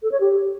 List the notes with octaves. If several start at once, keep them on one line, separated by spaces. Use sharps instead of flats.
A4
C#5
G4